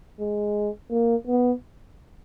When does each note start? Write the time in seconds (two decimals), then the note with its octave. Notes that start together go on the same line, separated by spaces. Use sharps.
0.20 G#3
0.91 A#3
1.27 B3